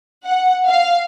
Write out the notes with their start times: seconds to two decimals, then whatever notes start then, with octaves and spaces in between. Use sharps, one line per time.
0.25 F#5
0.68 F5